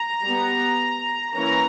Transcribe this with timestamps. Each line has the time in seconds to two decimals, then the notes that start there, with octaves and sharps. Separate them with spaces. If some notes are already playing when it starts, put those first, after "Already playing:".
Already playing: A#5
0.23 G3 B3
1.32 E3 A#3 C#4 A#5